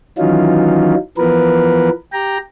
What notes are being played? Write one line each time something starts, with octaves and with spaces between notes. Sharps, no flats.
D#3 E3 F#3 C#4 D#4 F4
E3 F3 B3 A#4 B4
G4 G5 A#5